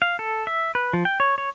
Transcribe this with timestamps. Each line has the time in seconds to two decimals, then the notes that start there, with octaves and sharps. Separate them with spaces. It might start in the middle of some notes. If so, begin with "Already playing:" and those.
0.02 F5
0.19 A4
0.47 E5
0.75 B4
0.93 F3
1.05 G5
1.20 C#5
1.38 C#5